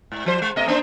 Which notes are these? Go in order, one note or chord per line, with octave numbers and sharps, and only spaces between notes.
G#2
F3 C5
G#3
B2 A3 D#5
A#3 D4 C5